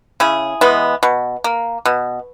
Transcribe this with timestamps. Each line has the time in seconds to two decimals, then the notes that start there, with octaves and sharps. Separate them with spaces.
0.20 C#3 E4 G#4
0.61 E3 G#3 B3
1.03 B2
1.44 A#3
1.85 B2